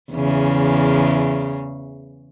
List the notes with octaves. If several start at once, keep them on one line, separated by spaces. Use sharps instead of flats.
E2 C#3